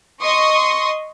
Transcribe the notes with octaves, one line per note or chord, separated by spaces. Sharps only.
D#5 C6 C#6 D#6